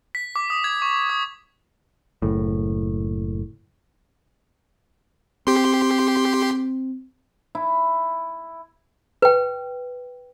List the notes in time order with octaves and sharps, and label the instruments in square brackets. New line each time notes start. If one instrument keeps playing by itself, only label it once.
[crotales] B6
D6
D#6
G#6
C#6
D#6
[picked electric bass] F#1 A2
[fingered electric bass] C4 [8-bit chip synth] G4 C6
[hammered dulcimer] E4
[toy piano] B4 G5